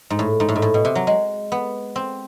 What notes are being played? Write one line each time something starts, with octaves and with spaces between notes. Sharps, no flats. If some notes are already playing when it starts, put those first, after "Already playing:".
G#2
A2
G#2
A2
G#2
A2
B2
C3
F#3
G#3
B3
C4